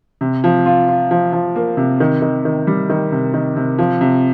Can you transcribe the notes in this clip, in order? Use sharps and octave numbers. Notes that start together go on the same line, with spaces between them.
C3
F3
F4
F4
F3
F3
A#3
C3
D#3
D#3
D#3
G3
D#3
C3
D#3
C3
F3
C3